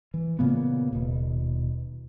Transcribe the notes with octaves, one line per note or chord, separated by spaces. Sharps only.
E3
A#2 C#3 A#3 B3
D#1 B2